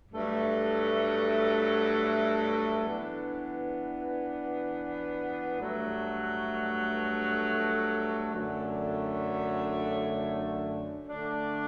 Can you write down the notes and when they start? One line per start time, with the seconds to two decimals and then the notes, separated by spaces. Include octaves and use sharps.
0.12 G2 F#3 A3
2.85 E3 B3 D4
5.59 G2 F#3 A3
8.33 F#2 D3 F#3 A3 D4
11.07 D3 A3 D4